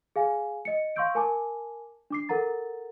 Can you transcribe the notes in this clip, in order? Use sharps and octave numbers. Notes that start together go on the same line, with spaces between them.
G#4 F5 G#5
D#5 C#7
F5 C6 C#6 E6 G6 D7
A#4 G#5 A5 D6
D4 D6 C7
A4 A#4 F#5 A#5 A6